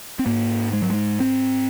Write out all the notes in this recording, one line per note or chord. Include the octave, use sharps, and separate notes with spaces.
C4
G#2 A#3
G#3
F#3
G#3
C4